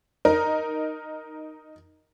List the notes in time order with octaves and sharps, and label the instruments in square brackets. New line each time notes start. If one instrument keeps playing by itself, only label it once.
[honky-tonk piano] D#4 A#4